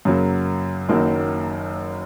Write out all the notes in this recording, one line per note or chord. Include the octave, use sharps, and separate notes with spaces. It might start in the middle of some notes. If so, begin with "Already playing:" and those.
F#2 C#3 F#3 A#3
F#1 F#2 D#3 F#3 A#3